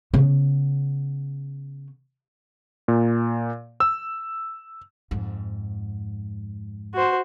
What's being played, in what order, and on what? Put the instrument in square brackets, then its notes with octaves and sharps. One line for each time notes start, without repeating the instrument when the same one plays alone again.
[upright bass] C#3 B3
[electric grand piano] A#2
E6
[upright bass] F2 G#2
[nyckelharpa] F#4 C5